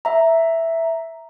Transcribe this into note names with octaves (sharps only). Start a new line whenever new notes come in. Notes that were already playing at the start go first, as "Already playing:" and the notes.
E5 A#5